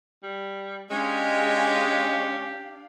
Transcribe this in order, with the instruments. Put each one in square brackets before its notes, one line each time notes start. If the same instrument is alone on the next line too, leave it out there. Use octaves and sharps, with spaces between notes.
[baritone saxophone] G3
[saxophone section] G#3 [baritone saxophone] C#4 [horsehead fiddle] D4 F5 [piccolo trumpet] G4